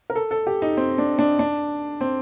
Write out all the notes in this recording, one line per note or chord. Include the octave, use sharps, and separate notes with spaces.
A#4
A4
A4
G4
D#4
C4
D4
D4
D4
C4